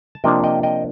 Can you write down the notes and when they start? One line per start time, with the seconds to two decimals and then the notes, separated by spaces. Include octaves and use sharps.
0.15 A5
0.24 C3 F3 A#3 D4 D#5 G5
0.44 D#5 G5
0.63 D#5 G5